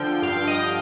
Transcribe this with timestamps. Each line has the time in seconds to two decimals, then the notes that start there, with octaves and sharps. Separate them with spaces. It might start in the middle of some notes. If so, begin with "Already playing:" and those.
Already playing: D3 F3 G5
0.22 G2 F5
0.47 D#5